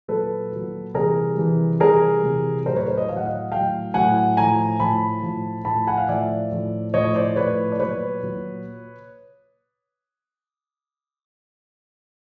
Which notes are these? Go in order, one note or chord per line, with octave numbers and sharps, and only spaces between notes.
A#2 F#3 A4 B4
A#2 F#3
C3 E3 G3 G#4 A#4
C3 E3 G3
C3 E3 G3 G#4 A#4
C3 E3 G3
A2 F#3 A#4 C5
B4 C#5
A#4 C5
C#5 D#5
A2 F#3 F5
F#5
D#5 F5
A2 F#3 F5 G5
A2 F#3 F#5 G#5
A2 F3 G#5 A#5
A2 F3 A5 B5
A2 F3
A2 F3 A5 B5
F#5 G#5
F5
A2 F3 D5 E5
A2 F3
A2 F3 C#5 D#5
C5 D5
A2 F3 B4 C#5
D5
A#2 F#3 B4 C#5
A#2 F#3